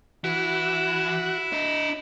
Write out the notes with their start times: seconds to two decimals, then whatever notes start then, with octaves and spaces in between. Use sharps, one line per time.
0.24 E3 E4 F#4
1.53 D4 D#5